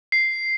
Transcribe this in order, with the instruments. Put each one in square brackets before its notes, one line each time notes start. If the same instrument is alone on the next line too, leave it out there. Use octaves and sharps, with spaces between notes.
[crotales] C7